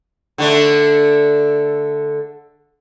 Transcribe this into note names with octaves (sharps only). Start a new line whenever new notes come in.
D3 A3 D4